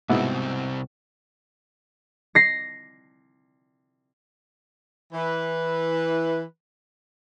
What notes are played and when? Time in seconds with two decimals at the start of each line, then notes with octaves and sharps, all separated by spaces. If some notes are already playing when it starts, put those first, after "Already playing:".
0.09 C2 G#2 B2 C4 E4
2.35 A#6 C7
5.13 E3 B4